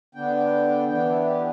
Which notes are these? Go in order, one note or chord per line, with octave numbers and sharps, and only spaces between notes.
D3 B3 D4 G5
E3 B3 D4 G5
E4
G4